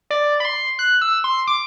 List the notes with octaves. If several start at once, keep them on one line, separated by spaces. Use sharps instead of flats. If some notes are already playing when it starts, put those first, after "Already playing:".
D5
B5
C6
F#6
E6
C6
D6